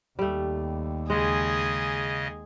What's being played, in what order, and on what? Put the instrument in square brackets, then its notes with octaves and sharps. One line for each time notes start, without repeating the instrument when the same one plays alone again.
[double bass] D#2 [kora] G3 A3
[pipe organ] C#3 D#5 [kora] G#3 [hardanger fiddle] G#4